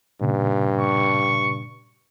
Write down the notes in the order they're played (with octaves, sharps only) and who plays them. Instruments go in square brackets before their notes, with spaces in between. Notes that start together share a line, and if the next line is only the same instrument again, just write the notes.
[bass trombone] G2 [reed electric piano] A#2 C#3
[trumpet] C#6